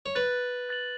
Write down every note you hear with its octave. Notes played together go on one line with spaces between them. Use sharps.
C#5
B4 F#6 A6 F#7
F#6 A6 F#7